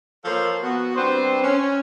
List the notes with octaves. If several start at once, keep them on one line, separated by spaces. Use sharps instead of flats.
F3 A#3 A4 C5 C#5 F5
B3 F#4
G3 C4 D4 B4 C5
C#4